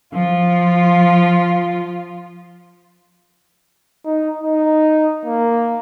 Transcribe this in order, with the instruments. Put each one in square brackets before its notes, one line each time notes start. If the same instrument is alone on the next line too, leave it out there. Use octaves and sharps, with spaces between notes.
[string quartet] F3 F4
[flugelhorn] D#4
D#4
A#3